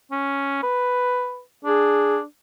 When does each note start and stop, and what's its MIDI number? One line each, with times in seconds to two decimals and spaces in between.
0.11 0.60 61
0.63 1.42 71
1.65 2.23 62
1.65 2.18 68